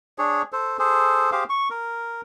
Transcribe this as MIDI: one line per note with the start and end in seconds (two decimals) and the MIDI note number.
0.18 0.42 62
0.18 0.42 68
0.18 0.42 73
0.52 0.77 69
0.52 0.77 72
0.79 1.31 68
0.79 1.31 69
0.79 1.31 72
1.32 1.44 67
1.32 1.44 68
1.32 1.44 72
1.32 1.44 77
1.49 1.69 85
1.70 2.21 70